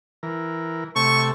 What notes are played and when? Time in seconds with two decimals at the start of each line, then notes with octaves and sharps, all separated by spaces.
0.23 E3 A#4
0.96 C3 A3 A4 C#6